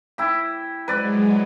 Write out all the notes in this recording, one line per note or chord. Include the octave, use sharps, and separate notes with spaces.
E4 G4
F#3 G#3 B4 D5